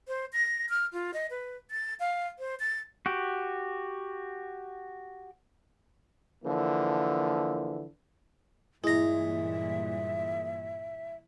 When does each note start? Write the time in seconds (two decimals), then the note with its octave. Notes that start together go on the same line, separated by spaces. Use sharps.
0.08 C5
0.33 A#6
0.69 F6
0.93 F4
1.14 D#5
1.30 B4
1.71 A6
2.00 F5
2.39 C5
2.60 A6
3.06 F#4 G4
6.44 D3 E3 F3 A#3
8.84 G2 A#2 E3 G#3 E4 E5 A#5 A#6